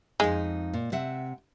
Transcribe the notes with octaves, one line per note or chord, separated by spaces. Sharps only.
F2 G#3 D#4 F5
A#2
C3 E5 F#5